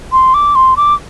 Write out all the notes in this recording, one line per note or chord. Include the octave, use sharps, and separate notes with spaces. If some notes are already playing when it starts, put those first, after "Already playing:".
C6
D6
C6
D6